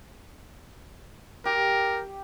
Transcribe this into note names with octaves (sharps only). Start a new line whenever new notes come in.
G4 A#4